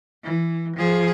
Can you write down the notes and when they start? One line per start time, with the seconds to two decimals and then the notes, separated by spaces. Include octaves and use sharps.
0.23 E3
0.76 F3 G#4